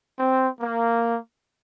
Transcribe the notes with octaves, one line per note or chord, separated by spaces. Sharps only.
C4
A#3